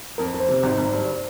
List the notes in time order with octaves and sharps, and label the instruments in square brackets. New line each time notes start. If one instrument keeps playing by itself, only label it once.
[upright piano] F2 [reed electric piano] A#4
[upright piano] F2
[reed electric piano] C5
[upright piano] C3
G#1
G#1
G2